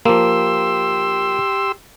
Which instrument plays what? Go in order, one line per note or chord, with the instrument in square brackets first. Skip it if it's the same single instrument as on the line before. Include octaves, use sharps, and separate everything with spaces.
[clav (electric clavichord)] F3 A#3 [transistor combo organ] G4 C6 E6